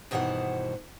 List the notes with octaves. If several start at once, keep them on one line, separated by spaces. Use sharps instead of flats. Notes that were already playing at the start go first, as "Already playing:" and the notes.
G2 B2 D#3 E3 C5 F#5